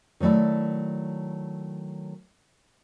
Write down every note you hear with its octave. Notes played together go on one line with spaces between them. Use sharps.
D#3 F#3 A3 E4 D5